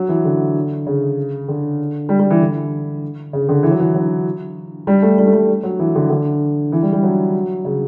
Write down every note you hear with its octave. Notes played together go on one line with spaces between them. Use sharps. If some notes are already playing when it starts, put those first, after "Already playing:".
Already playing: F#3
E3
D3
C#3
D3
G3
G3
E3
D3
C#3
D3
E3
F#3
E3
F#3
G3
A3
G3
A3
G3
F#3
E3
D3
D3
E3
G3
G3
F#3
C#3